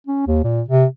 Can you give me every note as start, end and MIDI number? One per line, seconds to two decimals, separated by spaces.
0.06 0.22 61
0.27 0.40 39
0.44 0.62 46
0.68 0.85 48